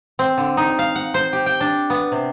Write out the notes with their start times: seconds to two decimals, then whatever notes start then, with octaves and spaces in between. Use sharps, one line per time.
0.19 C4
0.38 D3
0.57 D#4
0.79 F5
0.95 F#5
1.14 C5
1.33 G4
1.46 G5
1.61 D4
1.90 B3
2.12 C3